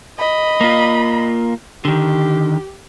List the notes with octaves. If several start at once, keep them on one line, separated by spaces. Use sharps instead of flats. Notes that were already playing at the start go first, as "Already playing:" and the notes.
D#5 B5
A#3 F4
D3 D#3 G4